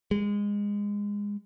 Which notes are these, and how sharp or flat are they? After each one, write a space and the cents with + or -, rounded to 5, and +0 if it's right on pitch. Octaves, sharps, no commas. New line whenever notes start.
G#3 -20